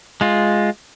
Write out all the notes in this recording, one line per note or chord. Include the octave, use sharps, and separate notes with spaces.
G#3 F4